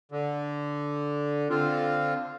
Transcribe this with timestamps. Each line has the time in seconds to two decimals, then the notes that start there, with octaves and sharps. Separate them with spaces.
0.12 D3
1.50 D3 C4 F4